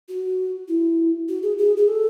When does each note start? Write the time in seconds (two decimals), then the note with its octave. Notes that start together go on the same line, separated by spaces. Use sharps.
0.08 F#4
0.68 E4
1.28 F#4
1.43 G#4
1.58 G#4
1.77 G#4
1.88 A4